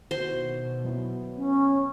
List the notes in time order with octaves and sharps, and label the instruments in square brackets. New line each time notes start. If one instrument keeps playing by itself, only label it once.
[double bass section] B2 [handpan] D#3 E4 F#4 [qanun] C5
[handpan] F#3 B3 E4
[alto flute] C#4